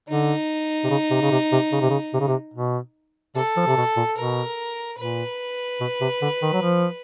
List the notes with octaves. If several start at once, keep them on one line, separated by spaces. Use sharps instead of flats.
D3 D#4
C3
C#3
C3
C#3
C3
C3
C#3
C3
C#3
C3
C#3
C3
B2
C3 A4
F3
C3
B2
A#2
B2 A#4
A#2 B4
B2
C3
D3
D#3
F#3
F3